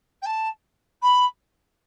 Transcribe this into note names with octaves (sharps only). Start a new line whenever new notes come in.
G5
A5
B5